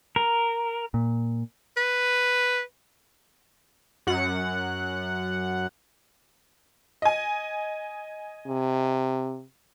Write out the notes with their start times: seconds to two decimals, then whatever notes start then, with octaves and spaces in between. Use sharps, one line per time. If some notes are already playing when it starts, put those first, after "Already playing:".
0.16 A#4
0.94 A#2
1.77 B4
4.07 F#2 F#5
7.02 D#5 G#5
8.48 C3